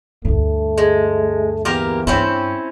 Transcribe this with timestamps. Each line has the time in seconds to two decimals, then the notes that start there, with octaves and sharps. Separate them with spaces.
0.25 D2 G2 A3
0.78 G#3
1.65 E2 A#3 G4 A#4
2.07 G2 C4 C#4 E4